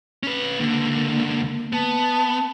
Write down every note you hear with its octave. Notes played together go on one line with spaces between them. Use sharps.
C#4 B4
C#2 D3 A#3
B3 A5